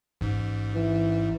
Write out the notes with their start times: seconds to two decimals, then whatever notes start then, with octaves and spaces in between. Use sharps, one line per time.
0.21 A1 G#2
0.75 E3